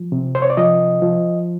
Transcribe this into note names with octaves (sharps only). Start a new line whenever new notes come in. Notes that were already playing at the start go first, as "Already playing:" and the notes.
Already playing: F3
C3
C5
C#5
D5
F3 D#5
F3